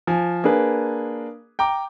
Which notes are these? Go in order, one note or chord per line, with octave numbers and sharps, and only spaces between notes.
F3 G#5
A#3 D4 G#4 B4
G5 A#5 D6